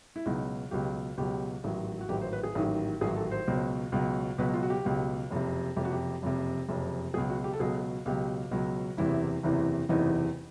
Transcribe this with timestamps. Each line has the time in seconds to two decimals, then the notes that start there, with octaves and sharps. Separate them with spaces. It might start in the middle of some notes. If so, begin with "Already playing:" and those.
0.16 E4
0.26 C#2 B2 F#3 D#4
0.71 C#2 B2 F#3 G4
1.17 C#2 B2 F#3 G4
1.64 A1 G#2 D#3 F#3
2.01 F#4
2.09 A1 G#2 D#3 F#3 G4
2.21 C5
2.33 B4
2.43 G#4
2.55 A1 G#2 D#3 F#3
3.01 A1 G#2 D#3 F#3 G#4
3.16 A4
3.31 C5
3.47 C#2 B2 F#3
3.92 C#2 B2 F#3
4.38 C#2 B2 F#3 B4
4.54 F4
4.63 F#4
4.70 G4
4.85 C#2 B2 F#3
5.30 F#1 F2 C3
5.76 F#1 F2 C3 G4
5.85 F#4
5.92 G4
6.22 F#1 F2 C3
6.69 F#1 F2 C3
7.13 C#2 B2 F#3 G#4
7.30 F#4
7.44 G4
7.53 A4
7.59 C#2 B2 F#3 G#4
8.06 C#2 B2 F#3 G4
8.51 C#2 B2 F#3
8.97 F#1 E2 C3 E3 E4
9.43 F#1 E2 C3 E3
9.89 F#1 E2 C3 E3 D#4